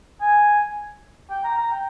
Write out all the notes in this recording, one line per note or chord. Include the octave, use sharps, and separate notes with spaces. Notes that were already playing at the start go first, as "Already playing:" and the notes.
G#5
G5
A#5
A#5
G5